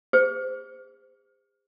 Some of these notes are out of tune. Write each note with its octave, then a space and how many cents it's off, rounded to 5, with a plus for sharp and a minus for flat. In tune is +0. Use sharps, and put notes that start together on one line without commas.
G#4 -40 C5 -25